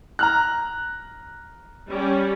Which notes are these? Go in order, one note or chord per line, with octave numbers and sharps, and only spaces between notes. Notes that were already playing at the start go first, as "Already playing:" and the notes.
A#5 F6 F#6
G3 C#4